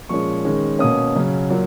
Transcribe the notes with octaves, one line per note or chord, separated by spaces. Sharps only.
A#2 F3 G#3 C#4 C#6
D#3 G#3 C#4
B2 A#3 C#4 D#6
C#3 F#3 C#4
A#2 F#3